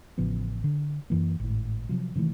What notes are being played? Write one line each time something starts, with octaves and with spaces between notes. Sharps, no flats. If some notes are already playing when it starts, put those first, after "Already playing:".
A1 C#3 F3 B3
D3
F#2 E3 A#3
G#1 A2
C3 F3 F#3
C3 D#3 E3 A3